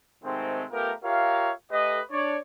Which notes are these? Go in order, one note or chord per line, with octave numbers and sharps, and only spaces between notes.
G#2 C3 D#3 G#3 A3 C4
A3 B3 F4 G4 A#4
F4 G4 A#4 C#5 E5 F5
A3 G4 A4 B4 D#5
D4 C#5 D5